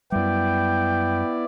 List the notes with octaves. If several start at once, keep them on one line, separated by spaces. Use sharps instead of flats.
F#2 G3 B3 E4 D5 G5